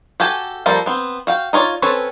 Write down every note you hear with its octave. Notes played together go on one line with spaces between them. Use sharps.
F#4 G4 A4 G#5
F3 G3 A#3 A4 C5
B3 C4
F#4 F5 G5
D#4 F4 C#5 D5
C4 C#4 A4 B4 C#5